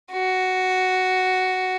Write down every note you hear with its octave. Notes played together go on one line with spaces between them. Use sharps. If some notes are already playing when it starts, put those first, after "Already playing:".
F#4